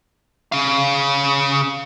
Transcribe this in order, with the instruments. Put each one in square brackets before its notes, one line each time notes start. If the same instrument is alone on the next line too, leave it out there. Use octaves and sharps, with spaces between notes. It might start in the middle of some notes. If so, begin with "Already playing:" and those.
[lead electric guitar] C#3 F5